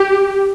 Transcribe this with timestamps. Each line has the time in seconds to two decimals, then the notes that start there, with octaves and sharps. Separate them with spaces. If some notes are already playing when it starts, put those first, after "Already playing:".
Already playing: G4